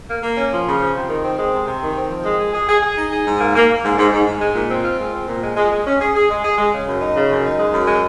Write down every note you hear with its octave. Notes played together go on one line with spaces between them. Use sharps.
A#3
A#3
C#4
F3
C#3
F3
C3
D#3
C4
G#3
C3
C3
D#3
C4
F3
G#3
G#4
G#4
G#4
G#4
D#4
G#4
G#2
A#3
A#3
A#3
G#2
G#2
G#2
G#2
G#3
A#2
C4
F4
G#3
C4
A#2
G#3
G#3
G#3
C#4
G#4
G#4
G#3
G#4
G#3
C#3
F#2
D#4
C#3
F#2
D#4
G#3
F#2
G#3